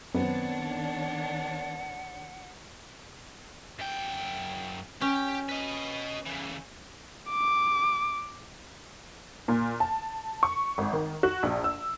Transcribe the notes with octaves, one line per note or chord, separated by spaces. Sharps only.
F#2 D#3 B3 C4 D4 C#5 F#5
F#2 G5
C#4 G4
B4 D#5
C#3 E3
D6
A#2
A5
C#6
G#1
D#3
F#4
A#1
E6